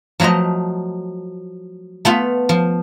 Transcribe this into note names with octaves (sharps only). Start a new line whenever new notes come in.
F3 F#3 A3 F4 D#5
A3 B3 F4
F3